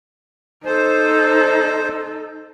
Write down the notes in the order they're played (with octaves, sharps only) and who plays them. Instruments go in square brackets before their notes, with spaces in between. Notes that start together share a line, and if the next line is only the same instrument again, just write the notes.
[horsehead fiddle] D#4 A4 [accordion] C5